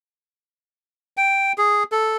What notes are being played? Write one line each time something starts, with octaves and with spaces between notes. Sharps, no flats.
G5
G#4
A4